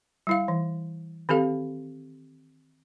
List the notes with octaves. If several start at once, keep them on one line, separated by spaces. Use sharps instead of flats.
G3 E4 F5
E3
D#3 C4 G4 A4 F5